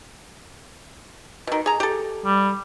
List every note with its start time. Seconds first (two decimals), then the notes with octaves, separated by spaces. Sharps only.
1.47 B2 D#3
1.66 G#4 A#5
1.80 G4 A4
2.25 G3